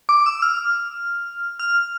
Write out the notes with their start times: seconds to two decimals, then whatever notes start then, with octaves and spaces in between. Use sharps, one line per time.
0.09 D6
0.26 E6
0.42 F6
1.60 F6